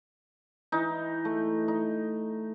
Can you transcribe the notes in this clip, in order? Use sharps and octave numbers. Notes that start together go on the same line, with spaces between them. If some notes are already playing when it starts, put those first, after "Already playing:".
E3 D#4
A3
D#4